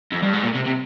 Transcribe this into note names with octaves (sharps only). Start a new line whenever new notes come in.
F2
G2
G#2
A#2
C3
C3